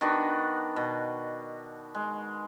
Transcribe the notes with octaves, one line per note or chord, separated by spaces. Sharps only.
D#3 B3 D4 F#4
B2
G#3